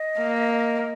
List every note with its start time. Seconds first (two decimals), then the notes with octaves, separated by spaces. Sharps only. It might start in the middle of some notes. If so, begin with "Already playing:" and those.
Already playing: D#5
0.18 A#3